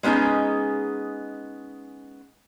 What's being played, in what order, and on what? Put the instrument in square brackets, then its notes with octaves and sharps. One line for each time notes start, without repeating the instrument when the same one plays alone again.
[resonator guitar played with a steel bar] G#3 B3 C#4 D#4 G#4